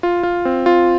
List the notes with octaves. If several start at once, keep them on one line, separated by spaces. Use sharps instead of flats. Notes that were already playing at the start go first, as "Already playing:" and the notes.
F4
F4
C4
F4